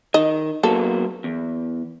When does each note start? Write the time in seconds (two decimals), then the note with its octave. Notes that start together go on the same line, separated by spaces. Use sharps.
0.14 D#3 D#5
0.63 F#3 A#3 B3 A4
1.24 E2